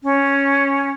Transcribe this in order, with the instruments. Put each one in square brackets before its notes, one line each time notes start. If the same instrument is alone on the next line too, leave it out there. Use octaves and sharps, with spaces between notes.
[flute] C#4